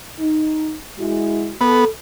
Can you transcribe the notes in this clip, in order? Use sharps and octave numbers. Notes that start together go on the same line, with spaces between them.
D#4
G#3 E4 F#4
B3 A4